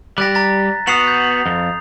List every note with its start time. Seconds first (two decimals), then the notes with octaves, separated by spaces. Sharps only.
0.18 G3 G4 F#6 A6 A#6
0.34 A#5 A6 B6
0.87 B3 F#4 D#6 C7 F7
1.07 G6
1.46 F2